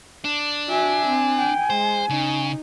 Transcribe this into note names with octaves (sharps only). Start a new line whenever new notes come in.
D4
F#4 E5 G#5
C4
G5
G#3 C5
C#3 D#4